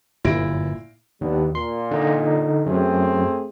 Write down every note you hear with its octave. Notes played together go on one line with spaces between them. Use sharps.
G1 F#2 A#2 E4 A#6 D7
D#2 G3 B3 D4
A#2 A#3 C6
D3 D#4 D#5
F#2 F#3 A3 C4 G#4